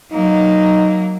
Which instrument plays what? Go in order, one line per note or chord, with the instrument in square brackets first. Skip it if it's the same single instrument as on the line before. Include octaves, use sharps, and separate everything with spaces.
[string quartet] F#3 A#3 [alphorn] D#4